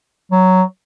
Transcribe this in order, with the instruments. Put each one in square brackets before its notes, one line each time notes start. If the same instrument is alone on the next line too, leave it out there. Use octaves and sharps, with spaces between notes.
[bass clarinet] F#3